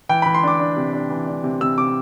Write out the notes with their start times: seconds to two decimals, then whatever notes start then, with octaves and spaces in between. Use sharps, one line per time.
0.09 E3 G5
0.22 E3 B5
0.35 C6
0.43 D4 D6
0.59 D4
0.77 C3
0.93 D4
1.10 E3
1.27 D4
1.44 C3
1.61 C3 E6
1.78 C3 D6